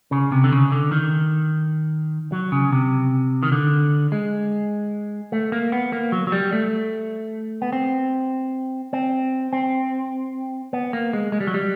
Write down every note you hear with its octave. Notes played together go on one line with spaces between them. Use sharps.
C#3
C3
D3
C#3
D3
D#3
F#3
C#3
C3
D#3
D3
G#3
A3
A#3
B3
A#3
F#3
F#3
G3
A3
B3
C4
C4
C4
B3
A#3
G#3
G#3
G3
F#3
G3